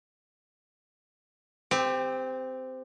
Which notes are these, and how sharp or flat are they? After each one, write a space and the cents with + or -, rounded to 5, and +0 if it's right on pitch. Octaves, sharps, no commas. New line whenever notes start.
C4 -15 G4 +20